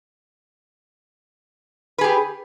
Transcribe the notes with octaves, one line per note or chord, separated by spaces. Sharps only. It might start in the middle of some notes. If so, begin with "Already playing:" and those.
G4 G#4 B4